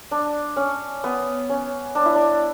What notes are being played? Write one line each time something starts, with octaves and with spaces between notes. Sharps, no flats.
D4
C#4
B3
C#4
D4
E4
D4